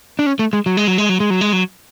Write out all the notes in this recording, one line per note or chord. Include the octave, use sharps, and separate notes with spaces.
D4
C#4
A3
G#3
F#3
G#3
F#3
G#3
F#3
G#3
F#3
G#3
F#3